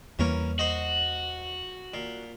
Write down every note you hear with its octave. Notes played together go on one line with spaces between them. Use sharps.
E2 E3 G3 A#3 C#4 A#4
F#4 C5 D#5
A#2